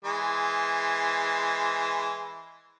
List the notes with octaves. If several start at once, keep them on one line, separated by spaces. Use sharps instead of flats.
E3 G#3 C5